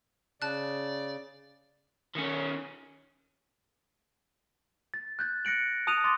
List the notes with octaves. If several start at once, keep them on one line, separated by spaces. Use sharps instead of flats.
C#3 D5 A5 F#6
D#3 C#4
A6
F#6 G6 A6
F#6 A#6 C#7 D7 F#7
A5 D#6 F#6 D#7 F7
C6 D6 D#6 A6